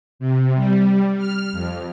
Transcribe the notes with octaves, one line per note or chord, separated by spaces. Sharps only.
C3
G3
F6
F2